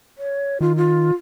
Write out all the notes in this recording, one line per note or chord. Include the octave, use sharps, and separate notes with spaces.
C#5
D#3 F4
F4